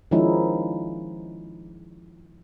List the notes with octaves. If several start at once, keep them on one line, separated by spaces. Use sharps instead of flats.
D#3 F3 G#3 C#4 D#4 E4